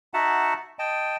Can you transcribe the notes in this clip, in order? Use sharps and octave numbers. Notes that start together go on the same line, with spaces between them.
D#4 F#4 E5 F#5 A5
D#5 G5 A5